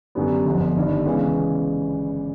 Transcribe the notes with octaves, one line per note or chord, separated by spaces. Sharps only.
F#2 D3 G3 B3
G1 F2 D3
G1 G2 D#3 G3
E2 C#3 E3 G#3 C#4